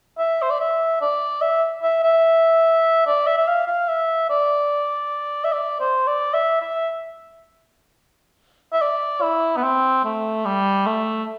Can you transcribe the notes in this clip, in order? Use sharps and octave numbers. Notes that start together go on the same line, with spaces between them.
E5
C5
D5
E5
D5
E5
E5
E5
D5
E5
E5
F5
F5
E5
D5
E5
D5
C5
D5
E5
E5
E5
D5
E4
B3
C4
A3
G3
A3